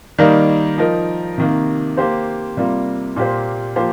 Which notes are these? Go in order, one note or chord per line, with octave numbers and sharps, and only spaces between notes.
D#3 G3 A#3 D#4 A#4
F3 D#4 A#4
C3 D#3 A#3
A#3 G4 C5
C3 G3 A#3 F4
A#2 A#3 G4 C5
F3 A#3 G4 C5